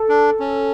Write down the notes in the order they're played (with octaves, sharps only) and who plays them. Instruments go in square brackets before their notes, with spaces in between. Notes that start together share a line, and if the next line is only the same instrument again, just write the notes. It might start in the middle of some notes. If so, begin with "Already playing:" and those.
Already playing: [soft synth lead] A4
[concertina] D4
C#4